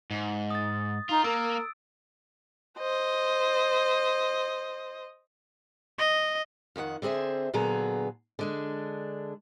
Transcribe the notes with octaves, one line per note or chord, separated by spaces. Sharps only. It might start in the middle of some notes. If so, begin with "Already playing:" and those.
G#2
D#6 A6
D#4 F4
A#3 A#4 E6 D7
C5 D#5
D#5
F2 D#3 F#4 F#5
D3 C4 G#4 C5 E5
A#2 D3 F#3 B3 G#4 A#5
D3 G#3 D4